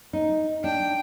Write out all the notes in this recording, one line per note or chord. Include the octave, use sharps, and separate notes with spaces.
D#4
D4 G5